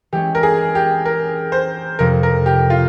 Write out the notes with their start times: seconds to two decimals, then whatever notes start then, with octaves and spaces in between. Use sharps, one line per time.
0.12 E3 G#3 C#4 G4
0.35 A#4
0.43 G#4
0.75 G4
1.05 A#4
1.52 C5
1.99 F2 C3 F3 A#4
2.23 A#4
2.46 G4
2.70 F4